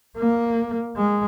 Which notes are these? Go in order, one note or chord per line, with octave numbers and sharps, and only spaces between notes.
A#3
G#3